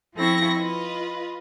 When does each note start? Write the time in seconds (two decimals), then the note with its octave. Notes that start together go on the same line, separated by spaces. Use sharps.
0.15 F3 C4 E4 A4 C#6 A#6
0.57 F4 B4 D#5